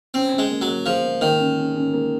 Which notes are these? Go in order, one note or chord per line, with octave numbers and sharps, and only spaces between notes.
C4 C#4
C#4
G#3
A#3
F#3
A#3
F3 G#4
A#3
D#3 A#3
C#4
C#4
C#4
A#3